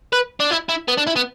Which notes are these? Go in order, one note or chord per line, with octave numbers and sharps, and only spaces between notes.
B4
D4
E4
E4
B3
D4
E4
B3